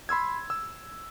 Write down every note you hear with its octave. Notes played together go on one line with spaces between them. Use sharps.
B5 C6 E6 G#6
E6